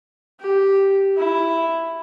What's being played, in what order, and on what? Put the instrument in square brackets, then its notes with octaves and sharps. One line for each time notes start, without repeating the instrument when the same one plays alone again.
[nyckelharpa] G4
E4